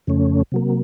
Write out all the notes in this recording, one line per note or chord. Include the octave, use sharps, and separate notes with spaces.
F2 C#3 A3 C#4
C3 F#3 A#3